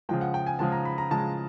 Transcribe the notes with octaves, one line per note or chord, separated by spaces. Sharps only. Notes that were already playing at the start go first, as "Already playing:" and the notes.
C#3 F3 G#3 G5
F#5
G5
G#5
C#3 F3 G#3 A5
A#5
B5
A#5
C#3 F3 G#3 A5